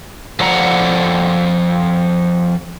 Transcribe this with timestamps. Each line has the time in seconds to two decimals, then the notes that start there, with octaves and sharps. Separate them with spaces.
0.40 F3 A4 D5 F#5 A#5